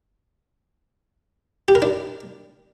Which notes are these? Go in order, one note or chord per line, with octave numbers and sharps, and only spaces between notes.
G4
A#4
D4